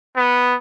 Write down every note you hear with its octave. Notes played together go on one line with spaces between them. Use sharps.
B3